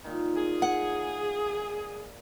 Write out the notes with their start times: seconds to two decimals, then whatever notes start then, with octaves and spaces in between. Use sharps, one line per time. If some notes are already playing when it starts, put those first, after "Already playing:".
0.04 A#2 D#3
0.36 G#4
0.62 F#5